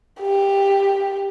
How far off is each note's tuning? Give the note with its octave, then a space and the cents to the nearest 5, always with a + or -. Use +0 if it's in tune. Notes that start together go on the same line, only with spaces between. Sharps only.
G4 +10